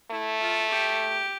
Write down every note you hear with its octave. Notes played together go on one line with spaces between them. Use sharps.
A3 E4
F4
G4